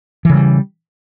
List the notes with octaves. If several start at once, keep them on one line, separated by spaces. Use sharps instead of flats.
C#3 E3 G3